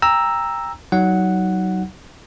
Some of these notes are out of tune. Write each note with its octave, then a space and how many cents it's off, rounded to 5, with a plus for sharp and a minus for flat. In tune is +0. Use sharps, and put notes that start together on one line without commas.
G5 +25 A#5 +0 E6 +0
F#3 +25 D#4 +10 F#5 +0